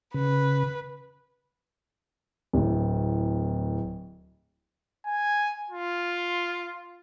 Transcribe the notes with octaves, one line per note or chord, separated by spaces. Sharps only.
C#3 B4
D1 A2
G#5
F4